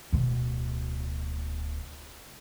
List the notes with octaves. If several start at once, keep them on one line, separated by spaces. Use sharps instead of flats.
D1 B2